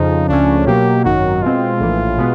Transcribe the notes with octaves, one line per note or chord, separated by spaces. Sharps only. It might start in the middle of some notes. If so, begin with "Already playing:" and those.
Already playing: F2 C#3 F3 D#4
C#2 C#3 F3 A3 C#4 D4
B2 F#3 A#3 G4
G#1 F#2 D#3 F#3 F#4
B2 G#3 C4 F4
A#1 A2 E3
B2 G#3 B3